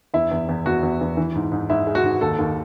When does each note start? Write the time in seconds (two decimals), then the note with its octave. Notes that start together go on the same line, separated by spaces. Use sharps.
0.14 E2 E4
0.31 E2
0.49 E2
0.66 E2 F#4
0.83 E2
1.01 E2
1.17 E3
1.35 G#2
1.52 G#2
1.70 G#2 E4
1.87 G#3
1.95 F#4
2.03 G#2
2.21 D#2 A4
2.38 D#2